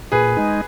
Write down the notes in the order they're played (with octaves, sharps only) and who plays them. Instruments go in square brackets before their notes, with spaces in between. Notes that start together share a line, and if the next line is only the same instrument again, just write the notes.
[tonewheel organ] A#2 [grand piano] G#4 B4
[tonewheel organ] G#3 D#4